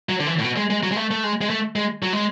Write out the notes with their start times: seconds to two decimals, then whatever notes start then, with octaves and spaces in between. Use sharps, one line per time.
0.09 F#3
0.20 D3
0.27 E3
0.39 A2
0.44 B2
0.57 G#3
0.70 G#3
0.83 F#3
0.92 G#3
0.96 A3
1.11 A3
1.24 G#3
1.41 G#3
1.50 A3
1.76 G#3
2.03 F#3
2.13 G#3